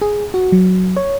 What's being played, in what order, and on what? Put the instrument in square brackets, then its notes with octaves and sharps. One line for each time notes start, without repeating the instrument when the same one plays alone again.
[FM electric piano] G#4
F#4
F#3
C#5